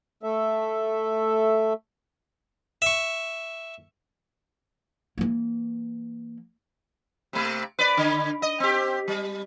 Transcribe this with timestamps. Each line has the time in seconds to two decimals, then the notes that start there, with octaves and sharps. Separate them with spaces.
0.23 A3 A4 E5
2.82 E5 C#6
5.18 E3 A#3
7.33 C3 A3
7.79 B4 D5
7.97 D3
8.42 D#5
8.60 C4 G4
9.08 G3